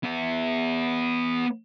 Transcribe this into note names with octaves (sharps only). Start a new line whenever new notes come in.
B3 E5